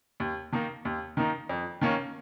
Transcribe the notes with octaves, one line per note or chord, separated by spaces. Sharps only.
D#2
D#3 A#3 D#4
D#2
D#3 A#3 D#4
F2
D#3 A#3 C#4